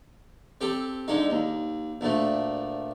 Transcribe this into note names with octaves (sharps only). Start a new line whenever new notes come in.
C4 G4 A4
D3 G#3 D#4
D#2
D2 A#2 A3